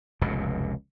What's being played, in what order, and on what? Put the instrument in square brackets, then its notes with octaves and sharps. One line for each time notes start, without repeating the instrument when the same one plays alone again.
[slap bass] F1 C#2 F#2 B2